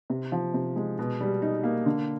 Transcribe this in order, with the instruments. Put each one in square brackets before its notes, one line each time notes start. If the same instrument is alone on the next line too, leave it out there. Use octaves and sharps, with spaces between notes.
[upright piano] C3
F3
C3
G#3
B2
G3
D#4
A#3
D3